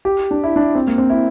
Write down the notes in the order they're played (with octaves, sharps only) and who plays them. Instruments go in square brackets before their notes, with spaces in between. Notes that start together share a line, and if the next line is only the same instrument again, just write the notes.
[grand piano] G4
D4
E4
D4
C4
A#3
C4
E4